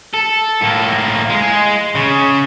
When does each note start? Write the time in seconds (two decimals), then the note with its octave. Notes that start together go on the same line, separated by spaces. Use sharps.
0.14 A4
0.61 A2 A#3
1.30 G#3
1.95 C#3